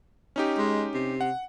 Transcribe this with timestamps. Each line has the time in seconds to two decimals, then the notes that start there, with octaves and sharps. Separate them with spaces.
0.36 C#4 D#4 G4
0.58 G#3
0.94 C3
1.21 F#5